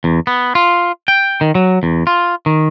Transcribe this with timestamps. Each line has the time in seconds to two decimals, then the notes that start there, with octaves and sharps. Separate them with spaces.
0.04 E2
0.27 B3
0.55 F4
1.08 G5
1.41 D#3
1.55 F#3
1.83 E2
2.07 F4
2.46 D#3